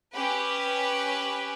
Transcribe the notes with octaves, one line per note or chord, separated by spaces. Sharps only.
C#4 G4 B4